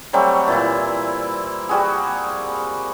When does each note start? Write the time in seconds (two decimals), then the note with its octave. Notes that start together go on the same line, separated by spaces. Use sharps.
0.13 F#3 G3 A3 C4
0.48 A#2 E3 E4
1.69 G3 F#4 G#4